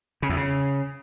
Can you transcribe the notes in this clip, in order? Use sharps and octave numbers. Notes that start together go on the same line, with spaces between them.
C#3
E2
C#3